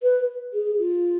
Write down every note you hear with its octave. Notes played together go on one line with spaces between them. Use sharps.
B4
G#4
F4